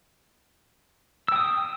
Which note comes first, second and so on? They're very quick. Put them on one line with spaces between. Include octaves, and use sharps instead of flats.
E6 G5 D#6